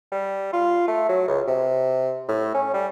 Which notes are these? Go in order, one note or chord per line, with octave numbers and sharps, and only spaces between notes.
G3
F4
A3
F#3
C#2
C3
A2
C#4
G3